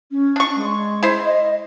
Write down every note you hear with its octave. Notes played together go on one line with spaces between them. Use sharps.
C#4
D4 C#6
G#3
E4 C5
D#5